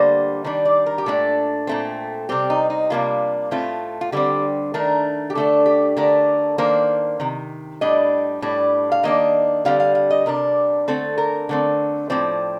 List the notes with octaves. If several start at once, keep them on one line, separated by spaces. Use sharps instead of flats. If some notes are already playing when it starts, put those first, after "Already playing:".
Already playing: D3 G3 A#3 C5
D#3 G3 D4 D5
D5
A#4
G4
A#2 A3 D4 A4
A#2 A3 C4
C3 G3 C4 G4
D#4
D#4
C3 G3 A#3 D4 F4
A2 A3 C4 F4
F4
D3 G3 C4 G4
D#3 A3 D4 A#4
G4
D3 A3 D4 A4
G4
D3 A3 D4 A#4
D#3 A#3 D4 C5
C3 D#3
A2 G3 D4 D#5
A2 G3 D4
F5
D#3 A#3 D4 D#5
D3 G3 C4 F5
F5
F5
D#5
C3 G3 D4 A#4
D3 A3 C4 A4
A#4
D3 A3 C4
A2 F3 C4 D5